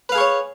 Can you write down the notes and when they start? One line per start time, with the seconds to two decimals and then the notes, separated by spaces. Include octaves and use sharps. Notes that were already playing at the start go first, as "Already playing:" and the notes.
0.09 B4
0.12 F5
0.15 G#4
0.18 C#6
0.20 C#5